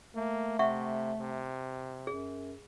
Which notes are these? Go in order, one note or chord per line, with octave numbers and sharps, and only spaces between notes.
A3 A#3
C3 E5 F#5 C#6
C3
F#2 G#4